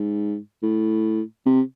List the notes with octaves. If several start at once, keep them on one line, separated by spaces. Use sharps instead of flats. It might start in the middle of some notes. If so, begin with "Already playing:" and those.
Already playing: G#2
A2
C3